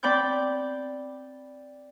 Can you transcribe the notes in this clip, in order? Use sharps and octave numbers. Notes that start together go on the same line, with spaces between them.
C4 D5 G5 B5 D6 G6